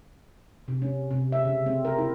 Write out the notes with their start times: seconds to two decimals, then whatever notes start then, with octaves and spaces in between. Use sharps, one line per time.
0.68 C3
0.82 C#4
1.11 C3
1.32 E5
1.45 C#3
1.66 C4
1.85 A#4
1.98 E4